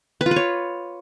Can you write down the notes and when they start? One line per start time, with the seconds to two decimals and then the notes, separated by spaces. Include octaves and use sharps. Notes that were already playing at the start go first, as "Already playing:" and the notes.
0.21 B4
0.26 F4
0.31 B4
0.36 C#5